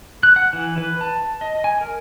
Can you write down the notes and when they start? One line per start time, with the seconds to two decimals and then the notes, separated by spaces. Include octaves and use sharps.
0.23 F#6
0.36 F#5
0.53 E3
0.78 B4
1.01 A5
1.41 D#5
1.64 G#5
1.81 A#4